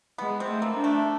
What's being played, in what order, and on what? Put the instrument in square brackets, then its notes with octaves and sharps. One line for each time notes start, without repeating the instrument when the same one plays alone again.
[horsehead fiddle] G#3 [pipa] B3
[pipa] C4
[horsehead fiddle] A3
[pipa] A#3
[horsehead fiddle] D4
[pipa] A3